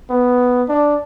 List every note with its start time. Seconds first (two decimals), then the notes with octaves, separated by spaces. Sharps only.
0.10 B3
0.69 D4